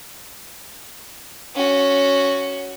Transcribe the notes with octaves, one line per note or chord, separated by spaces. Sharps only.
C#4 F#4